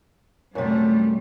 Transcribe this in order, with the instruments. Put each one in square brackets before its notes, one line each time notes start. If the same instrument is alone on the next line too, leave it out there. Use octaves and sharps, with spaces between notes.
[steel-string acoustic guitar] F#2 C3 [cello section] G3 A3